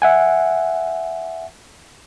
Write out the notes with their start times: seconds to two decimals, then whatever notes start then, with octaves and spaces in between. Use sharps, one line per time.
0.02 E5 F#5 G#5